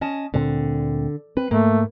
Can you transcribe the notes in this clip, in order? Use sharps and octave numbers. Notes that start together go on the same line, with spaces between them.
C#4 D#5 A5
D2 A#2 D3 C4
C4 B4
G#2 A3 A#3